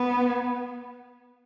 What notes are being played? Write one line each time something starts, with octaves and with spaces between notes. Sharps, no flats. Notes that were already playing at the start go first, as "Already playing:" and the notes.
Already playing: B3